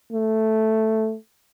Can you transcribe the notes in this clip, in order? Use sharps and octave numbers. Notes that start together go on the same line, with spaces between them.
A3